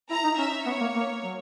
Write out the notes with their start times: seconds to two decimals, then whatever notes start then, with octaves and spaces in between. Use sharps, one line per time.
0.10 E4 A#5
0.24 D#4
0.38 C#4 E5
0.66 B3 C#5
0.81 A#3
0.95 A#3
1.24 F#3